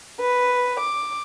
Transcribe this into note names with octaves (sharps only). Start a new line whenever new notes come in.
B4
D6